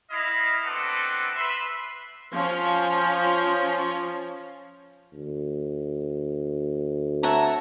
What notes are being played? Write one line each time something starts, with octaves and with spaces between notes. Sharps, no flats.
E4 D#5 F5
B3 C4 D4 F#4 A4 B4
B4 E5 C6
F3 C#4
D2
C#5 E5 F#5 A5 A#5